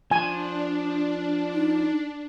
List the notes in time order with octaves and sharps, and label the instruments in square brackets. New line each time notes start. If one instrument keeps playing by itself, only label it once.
[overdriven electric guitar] F3 [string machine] D4 [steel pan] G#5
[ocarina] D#4